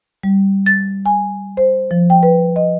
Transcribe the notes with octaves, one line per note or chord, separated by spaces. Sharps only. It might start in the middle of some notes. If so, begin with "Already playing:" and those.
G3
A6
G#5
C5
F3
G5
B4
D#5